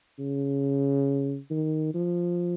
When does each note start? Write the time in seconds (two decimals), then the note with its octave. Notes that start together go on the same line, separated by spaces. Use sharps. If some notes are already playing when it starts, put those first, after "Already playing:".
0.19 C#3
1.51 D#3
1.94 F3